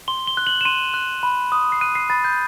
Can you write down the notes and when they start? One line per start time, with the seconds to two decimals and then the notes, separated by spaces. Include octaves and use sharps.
0.08 C6 G7
0.27 G7
0.37 F#6
0.47 F#7
0.61 E7
0.65 C6 D#7
0.94 F#6
1.23 B5
1.52 D#6
1.72 C7
1.81 F#6 D#7
1.95 C7
2.10 B5 A6
2.24 G6